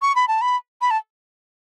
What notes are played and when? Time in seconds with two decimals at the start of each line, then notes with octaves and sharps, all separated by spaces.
0.02 C#6
0.15 B5
0.28 A5
0.41 B5
0.81 B5
0.91 A5